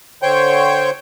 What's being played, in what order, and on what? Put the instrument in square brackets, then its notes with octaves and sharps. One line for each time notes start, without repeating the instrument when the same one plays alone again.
[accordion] D3 C5 C#5 G5 C#6 G6